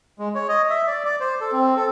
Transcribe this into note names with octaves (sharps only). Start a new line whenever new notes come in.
G#3
C#5
D#5
E5
D5
D5
C5
A4
C4
A4